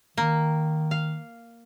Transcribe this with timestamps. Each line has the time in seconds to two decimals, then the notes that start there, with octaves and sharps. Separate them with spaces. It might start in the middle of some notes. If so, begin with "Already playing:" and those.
0.17 D#3 A#3
0.91 F5